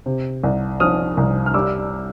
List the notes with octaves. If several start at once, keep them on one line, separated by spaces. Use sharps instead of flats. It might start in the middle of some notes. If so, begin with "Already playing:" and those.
C3
C2
F3 D#6 F6
C2
F6
G3 D6 E6